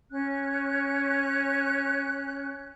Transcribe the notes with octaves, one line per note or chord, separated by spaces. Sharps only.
C#4 F#6